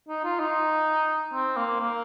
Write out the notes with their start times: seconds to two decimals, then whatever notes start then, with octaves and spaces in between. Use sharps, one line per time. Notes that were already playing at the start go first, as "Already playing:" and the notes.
0.09 D#4
0.24 F4
0.40 D#4
1.34 C4
1.57 A#3
1.81 A#3